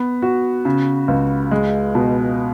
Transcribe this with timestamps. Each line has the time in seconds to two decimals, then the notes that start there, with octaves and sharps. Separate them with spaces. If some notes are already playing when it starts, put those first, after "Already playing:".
Already playing: B3
0.22 F#4
0.65 C#3
1.08 C#2
1.51 G#3
1.95 B2